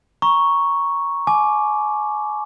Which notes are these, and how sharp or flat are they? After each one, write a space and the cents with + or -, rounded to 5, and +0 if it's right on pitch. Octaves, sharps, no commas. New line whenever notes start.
A#5 +15 C#6 +0
G#5 +30 D6 +0